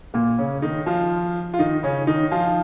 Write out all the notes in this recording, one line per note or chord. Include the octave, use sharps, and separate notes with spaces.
A#2 A#3
C#3 C#4
D#3 D#4
F3 F4
F4
D#3 D#4
C#3 C#4
D#3 D#4
F3 F4